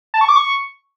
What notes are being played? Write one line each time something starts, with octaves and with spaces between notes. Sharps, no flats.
A5
C#6
D6
C#6